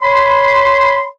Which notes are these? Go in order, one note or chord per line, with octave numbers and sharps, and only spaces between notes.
C#5 B5 C6